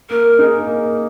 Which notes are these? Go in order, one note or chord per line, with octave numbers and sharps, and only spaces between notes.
A#3 A#4
D#4 G#4
A#3